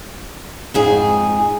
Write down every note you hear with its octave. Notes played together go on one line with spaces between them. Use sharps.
F2 G#2 G#4